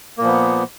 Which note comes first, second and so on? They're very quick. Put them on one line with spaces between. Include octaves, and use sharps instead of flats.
A#3 A#2 F3 B3